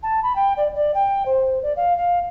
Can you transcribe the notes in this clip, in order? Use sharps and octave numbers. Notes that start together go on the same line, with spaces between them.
A5
B5
G5
D5
D5
G5
C5
D5
F5
F5